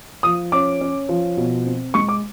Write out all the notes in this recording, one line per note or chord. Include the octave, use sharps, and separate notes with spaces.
F3 D#6
C#4 D6
C#4
F3
B2
C4
G#3 C#6
D6